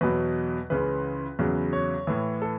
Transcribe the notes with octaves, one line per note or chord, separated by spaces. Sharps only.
E2 B2 F#3 B4
C#2 C#3 E3 B4
E2 C#3 F#3
C#5
A2 E3
A4